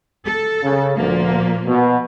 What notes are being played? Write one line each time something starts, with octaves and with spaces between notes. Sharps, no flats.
A4
C#3
D2 A#2 F3 A#3
B2